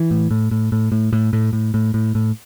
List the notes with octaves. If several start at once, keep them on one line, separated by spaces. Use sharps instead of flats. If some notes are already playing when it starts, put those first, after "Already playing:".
Already playing: E3
A2
A2
A2
A2
A2
A2
A2
A2
A2
A2
A2